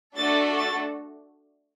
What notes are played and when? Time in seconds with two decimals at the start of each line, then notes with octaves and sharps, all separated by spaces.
0.16 A3 D4 F#4 A4 A6
0.59 A6